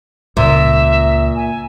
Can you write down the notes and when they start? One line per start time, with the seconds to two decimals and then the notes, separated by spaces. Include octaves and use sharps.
0.37 C#2 A#2 E5
1.35 G#5